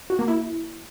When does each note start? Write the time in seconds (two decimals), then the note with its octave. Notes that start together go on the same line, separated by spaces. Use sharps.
0.10 F#4
0.19 A#3
0.28 E4